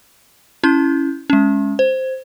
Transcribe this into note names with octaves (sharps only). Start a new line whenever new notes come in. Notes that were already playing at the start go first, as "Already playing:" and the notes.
C#4 E4 G6
G#3 C#4
C5